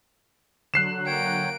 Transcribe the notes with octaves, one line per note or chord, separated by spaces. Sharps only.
D3 F#3 F#6 C7 E7
A#3 C#5 F#5 G5 D7